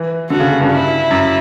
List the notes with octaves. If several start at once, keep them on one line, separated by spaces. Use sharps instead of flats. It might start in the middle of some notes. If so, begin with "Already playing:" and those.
Already playing: E3
D3 F#4
C#3
G2
E4
F#2